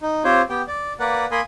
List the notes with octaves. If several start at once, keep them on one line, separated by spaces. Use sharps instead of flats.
D#4
C4 F4 G4 C5 C#5
B3 G4 G5
D5
A#3 A#4 B4 D5 F#5
A#3 A#4 G#5 B5 C6 D#6